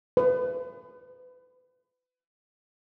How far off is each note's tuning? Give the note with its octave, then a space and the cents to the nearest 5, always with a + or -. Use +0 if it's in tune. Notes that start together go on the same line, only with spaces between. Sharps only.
B4 +35